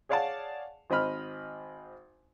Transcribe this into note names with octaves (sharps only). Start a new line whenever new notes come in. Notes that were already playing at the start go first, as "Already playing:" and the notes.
G#4 C#5 D5 F5 F#5 A5
G#1 C4 D#5 B5 F6